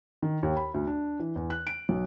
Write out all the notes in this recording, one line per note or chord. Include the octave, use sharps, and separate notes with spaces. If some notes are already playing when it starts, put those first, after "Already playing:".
D#3
D#2
B5
D2
D4
E3
E2
F#6
D7
B1